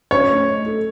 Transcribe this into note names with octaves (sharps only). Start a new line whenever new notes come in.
C#4 C#5
A3
D#5
A4